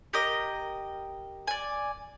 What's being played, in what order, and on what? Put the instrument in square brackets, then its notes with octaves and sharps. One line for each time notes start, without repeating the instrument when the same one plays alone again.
[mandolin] G4 A#4 D#5
D5 G#5